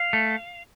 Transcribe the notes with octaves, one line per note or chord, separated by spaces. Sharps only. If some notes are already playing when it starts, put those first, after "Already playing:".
Already playing: F5
A3